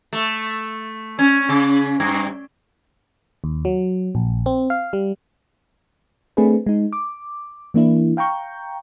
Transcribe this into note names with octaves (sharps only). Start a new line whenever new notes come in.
A3
C#4
C#3
G2
D#2
F#3
A#1
C4
F5
G3
A3 C4 D4 G#4 B4
G#3 D#4
D6
E3 A#3 D4 E4
F5 G5 A#5 C#6 G6